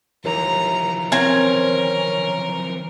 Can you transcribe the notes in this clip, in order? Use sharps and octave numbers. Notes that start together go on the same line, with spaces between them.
D#2 E3 F3 A#5
C4 C#4 A#4 G#5